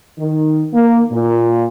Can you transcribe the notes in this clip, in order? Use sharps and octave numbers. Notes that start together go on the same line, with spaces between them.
D#3
A#3
A#2